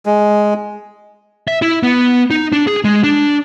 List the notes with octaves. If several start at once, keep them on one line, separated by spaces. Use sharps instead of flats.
G#3
E5
E4
B3
D#4
D4
G#4
G#3
D4